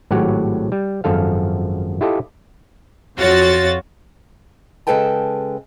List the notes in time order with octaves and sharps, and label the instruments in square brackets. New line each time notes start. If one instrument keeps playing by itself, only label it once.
[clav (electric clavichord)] G#1 A2 F#3 G4 C#5 F#5
G3
G#1 F#2 F3 A4 F5
E4 F4 G4 A4 D#5
[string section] F2 F4 F#4 C#5 A6
[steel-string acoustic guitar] C#3 G#3 A4 B4 G5 A5